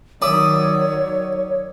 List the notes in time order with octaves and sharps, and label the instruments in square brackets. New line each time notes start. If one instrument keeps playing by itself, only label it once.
[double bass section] D#3 F#3 [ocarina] C#5 [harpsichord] D5 E5 [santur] D#6